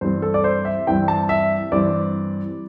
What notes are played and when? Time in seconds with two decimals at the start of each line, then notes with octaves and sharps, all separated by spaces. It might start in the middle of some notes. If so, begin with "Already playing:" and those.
0.01 G2 E3 C4 C5
0.22 A4
0.34 D5
0.44 C5
0.65 E5
0.87 G2 E3 C4 G5
1.08 A5
1.29 E5
1.72 G2 E3 C4 D5